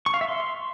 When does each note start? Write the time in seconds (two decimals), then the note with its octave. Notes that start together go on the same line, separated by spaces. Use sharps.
0.06 C#6
0.14 F5
0.21 E5
0.28 C6